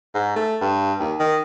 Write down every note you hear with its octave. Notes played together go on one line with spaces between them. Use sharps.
G#2
A3
G2
D#2
D#3